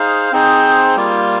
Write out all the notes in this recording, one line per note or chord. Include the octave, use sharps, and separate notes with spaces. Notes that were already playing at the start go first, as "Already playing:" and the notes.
Already playing: D#4 G#4 C5 F5
C4 D#4 G#4 C5
G3 A#3 F4